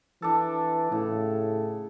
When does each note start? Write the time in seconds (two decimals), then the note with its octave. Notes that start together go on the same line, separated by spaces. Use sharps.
0.22 E3 D4 A4
0.92 A2 C#3